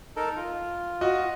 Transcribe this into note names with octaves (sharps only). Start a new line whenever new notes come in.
D#4 A4 A#4
F4
F#4 D#5